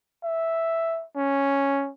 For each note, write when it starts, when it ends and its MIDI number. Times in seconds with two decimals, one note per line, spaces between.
0.24 1.04 76
1.16 1.90 61